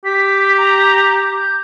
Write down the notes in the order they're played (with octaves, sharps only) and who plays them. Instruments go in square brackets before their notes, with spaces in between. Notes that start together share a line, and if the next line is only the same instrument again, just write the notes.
[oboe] G4 [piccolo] B6
[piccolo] A#5
G6